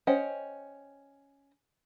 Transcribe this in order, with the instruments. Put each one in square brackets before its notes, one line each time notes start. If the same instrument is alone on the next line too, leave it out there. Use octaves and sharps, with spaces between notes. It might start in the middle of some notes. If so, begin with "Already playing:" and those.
[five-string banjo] C#4 C5 D#5 F#5 G5